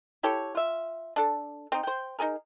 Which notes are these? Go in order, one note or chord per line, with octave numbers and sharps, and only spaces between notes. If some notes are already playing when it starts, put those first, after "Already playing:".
E4 G4 A4 C#5
F4 E5
D4 A4
C4 D#4
C5 G5
D#4 F4 G#4 A#4